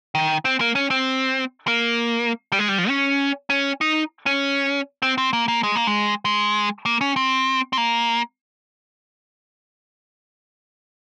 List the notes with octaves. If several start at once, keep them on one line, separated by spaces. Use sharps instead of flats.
D#3
C4
A#3
C#4
C4
A#3
G3
G#3
G3
F3
C#4
C#4
D#4
C#4
C4
C4
A#3
A#3
G#3
A#3
G#3
G#3
A#3
C#4
C4
C4
A#3